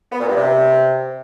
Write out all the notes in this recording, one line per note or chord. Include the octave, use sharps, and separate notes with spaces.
B3
A#2
G2
C3